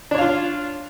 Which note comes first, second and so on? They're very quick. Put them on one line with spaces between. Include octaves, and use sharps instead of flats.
D4 C#5 F5 F4